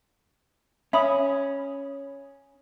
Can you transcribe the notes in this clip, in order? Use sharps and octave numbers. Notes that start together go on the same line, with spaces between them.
C#4 E5 B5 D#6